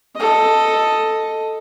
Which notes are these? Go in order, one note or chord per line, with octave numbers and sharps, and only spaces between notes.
A4 D#5